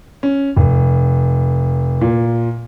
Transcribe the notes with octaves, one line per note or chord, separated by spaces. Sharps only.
C#4
F1
A#2